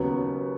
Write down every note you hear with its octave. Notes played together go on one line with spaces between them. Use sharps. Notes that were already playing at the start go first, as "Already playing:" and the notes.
Already playing: D#2 C#3 F#3 B3